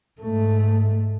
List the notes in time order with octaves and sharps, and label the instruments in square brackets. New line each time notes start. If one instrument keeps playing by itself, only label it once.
[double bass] G#2 A3